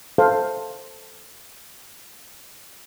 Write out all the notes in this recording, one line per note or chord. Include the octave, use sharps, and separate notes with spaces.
A4 C5 F5